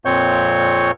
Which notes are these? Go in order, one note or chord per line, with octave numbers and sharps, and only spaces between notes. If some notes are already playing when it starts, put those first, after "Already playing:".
F2 A#2 C4 C#5 C#6 G6